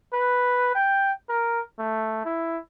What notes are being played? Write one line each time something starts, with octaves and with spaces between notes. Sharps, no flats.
B4
G5
A#4
A3
E4